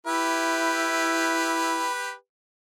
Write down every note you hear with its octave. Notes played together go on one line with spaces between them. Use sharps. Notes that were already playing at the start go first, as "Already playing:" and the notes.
E4 G4 B4